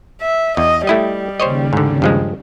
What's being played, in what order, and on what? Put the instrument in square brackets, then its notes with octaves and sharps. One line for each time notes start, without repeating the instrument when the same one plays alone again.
[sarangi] E5
[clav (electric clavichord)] E2 [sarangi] D#5
[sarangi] G3 [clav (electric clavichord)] A3 E4 D#5
[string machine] D#2 C#3 [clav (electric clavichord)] C5 C#5 D#5
[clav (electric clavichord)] G#2 D3
G2 F3 G#3